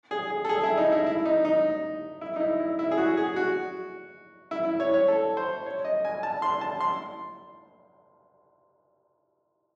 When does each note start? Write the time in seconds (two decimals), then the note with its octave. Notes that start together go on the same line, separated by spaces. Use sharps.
0.11 G#4
0.30 G#4
0.45 A4
0.49 G#4
0.64 E4
0.78 D#4
0.92 E4
1.06 E4
1.26 D#4
1.45 D#4
2.21 E4
2.36 D#4
2.40 E4
2.60 E4
2.79 E4
2.91 G#4
2.98 F#4
3.17 G#4
3.36 F#4
4.51 E4
4.65 E4
4.80 C#5
4.94 C#5
5.08 A4
5.37 C5
5.66 C#5
5.85 D#5
6.05 G#5
6.23 A5
6.42 C6
6.61 A5
6.81 C6